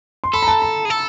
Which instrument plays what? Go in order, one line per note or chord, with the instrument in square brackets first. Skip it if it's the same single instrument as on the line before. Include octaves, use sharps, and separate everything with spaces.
[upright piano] C6
[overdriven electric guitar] A4 [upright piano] B5
[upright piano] A#5
A5
A#5
[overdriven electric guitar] G#4
A4